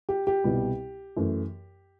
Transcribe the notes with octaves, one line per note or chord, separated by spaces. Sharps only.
G4
G4
C2 B2 G3
F#2 E3 A3